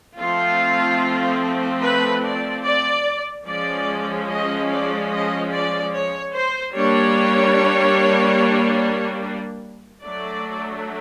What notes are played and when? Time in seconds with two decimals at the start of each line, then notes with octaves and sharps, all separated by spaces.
0.18 F3 A3 C4 F4
1.82 B4
2.23 D5
2.64 D5
3.46 F3 G#3 C#4 D5
4.28 D#5
4.70 D5
5.11 D#5
5.51 D5
5.93 C#5
6.33 C5
6.74 G3 A#3 D4 C#5
10.02 F#3 A3 D4 D5